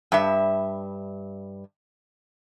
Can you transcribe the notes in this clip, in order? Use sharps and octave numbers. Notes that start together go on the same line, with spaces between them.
G2 E5